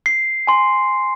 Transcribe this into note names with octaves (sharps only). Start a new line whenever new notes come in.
C7
G#5 C6